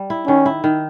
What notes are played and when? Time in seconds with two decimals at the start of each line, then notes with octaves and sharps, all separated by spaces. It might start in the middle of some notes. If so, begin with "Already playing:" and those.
Already playing: G3
0.10 E4
0.27 D#3 C#4
0.46 E4
0.64 D#3